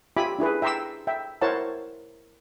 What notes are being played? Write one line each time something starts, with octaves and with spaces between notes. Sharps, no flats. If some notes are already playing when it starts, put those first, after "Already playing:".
F4 G4 E5 G#5 B5 D6
D4 E4 G#4 B4
E5 G5 A#5 C6 D6 E6
E5 G5
E4 A#4 C5 C#5 F#5 A5